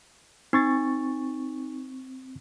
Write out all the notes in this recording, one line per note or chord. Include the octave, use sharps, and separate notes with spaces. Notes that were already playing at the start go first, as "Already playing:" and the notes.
C4 D#4 C#6 A6